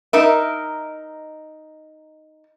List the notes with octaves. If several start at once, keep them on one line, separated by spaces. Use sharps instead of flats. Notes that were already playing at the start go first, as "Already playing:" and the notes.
D#4 A#4 E5